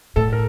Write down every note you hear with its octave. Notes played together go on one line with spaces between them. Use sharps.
A2 A4
A#4